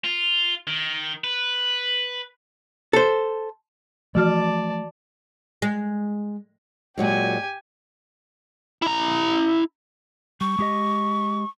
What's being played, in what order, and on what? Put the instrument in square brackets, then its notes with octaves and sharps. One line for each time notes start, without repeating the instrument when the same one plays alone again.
[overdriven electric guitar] F4
D#3
B4
[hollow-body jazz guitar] A4 C5
[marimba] E3 F#4 F6 [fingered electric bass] F3 A3 [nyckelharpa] D5 A5
[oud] G#3
[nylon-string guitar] A#2 F#3 G#3 [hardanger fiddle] G4 G#5
[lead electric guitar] E4 A#5
[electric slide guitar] G3 [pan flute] C#6
[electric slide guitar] G#3 G4 D#5